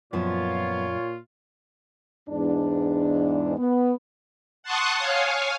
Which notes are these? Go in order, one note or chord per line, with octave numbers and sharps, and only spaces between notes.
F#2 A#2 F3 B3 F4 C#5
E2 G#2 D4
B3
F#5 A5 C6 C#6 D#6 F#6
C#5 F5 G#5